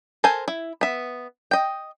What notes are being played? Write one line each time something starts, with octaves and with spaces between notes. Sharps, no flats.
A4 A#4 C5 G#5
E4
B3 E5
D#5 G5